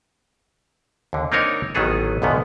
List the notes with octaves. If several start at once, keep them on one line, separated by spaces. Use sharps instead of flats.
D#2 D3
A#3 C4 D4 D#4 A#4 C#5
A1 D#3 F#3 B3 G#4 A4
B1 E2 G#2 D3 D#3 B3